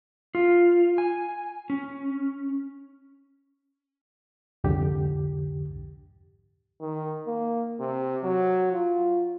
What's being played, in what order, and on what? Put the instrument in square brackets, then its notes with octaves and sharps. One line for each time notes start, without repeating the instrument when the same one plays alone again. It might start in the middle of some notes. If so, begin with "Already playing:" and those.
[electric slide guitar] F4
G#5
C#4
[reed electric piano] C2 F2 G#2 D3 G4
[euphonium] D#3
A#3
C3
F#3
F4